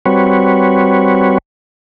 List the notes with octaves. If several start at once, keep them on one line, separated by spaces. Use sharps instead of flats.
G3 C4 F#4 B4 C#5